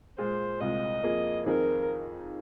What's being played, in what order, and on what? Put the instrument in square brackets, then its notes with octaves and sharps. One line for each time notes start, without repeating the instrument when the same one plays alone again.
[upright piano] A#2 G#3 F4 G#4 [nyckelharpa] C5
[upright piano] C2 A#2 G#3 [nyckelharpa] D#5
[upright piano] F2 F3 A#3 G#4
[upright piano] F2 D#3 C4 D#4 G#4 [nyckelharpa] A#4